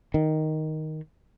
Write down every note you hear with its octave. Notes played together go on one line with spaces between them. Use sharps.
D#3